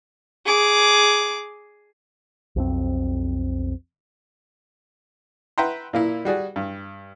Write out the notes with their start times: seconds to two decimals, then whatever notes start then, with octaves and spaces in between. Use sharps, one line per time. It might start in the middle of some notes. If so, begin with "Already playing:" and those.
0.46 G#4 D6
2.56 B1 F2 C4
5.58 B4 E5 F#5 G5 A#5 C6
5.93 A#2 A#3 E4
6.25 G3 F#4 G#4 D5
6.56 G2